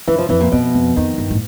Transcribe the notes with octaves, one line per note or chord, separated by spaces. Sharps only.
F#2 E3
F3
F2 E3
A#2
F2 B2
F2
F2 D#3
G2
A2